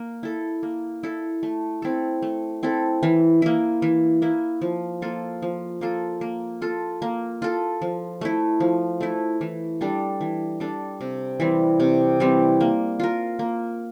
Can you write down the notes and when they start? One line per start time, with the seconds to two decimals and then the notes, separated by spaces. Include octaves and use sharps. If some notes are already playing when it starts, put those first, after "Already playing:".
Already playing: A#3
0.23 E4 A4
0.63 A#3
1.03 E4 A4
1.43 A3
1.82 C4 E4 A4
2.22 A3
2.63 C4 E4 A4
3.03 E3
3.42 A#3 E4
3.82 E3
4.22 A#3 E4
4.61 F3
5.02 A#3 F4 A4
5.42 F3
5.81 A#3 F4 A4
6.21 A#3
6.62 F4 A4
7.02 A#3
7.42 F4 A4
7.82 F3
8.21 A3 E4
8.60 F3
9.00 A3 E4
9.41 E3
9.81 G3 D4 A4
10.21 E3
10.60 G3 D4 A4
11.01 C3
11.40 E3 G3 C4
11.80 C3
12.20 E3 G3 C4
12.60 A#3
13.00 F4 A#4
13.39 A#3